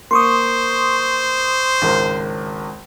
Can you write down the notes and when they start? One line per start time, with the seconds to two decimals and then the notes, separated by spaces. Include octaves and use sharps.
0.11 A#3 C5 C6 C#6 D#6
1.82 G#1 C#2 A#4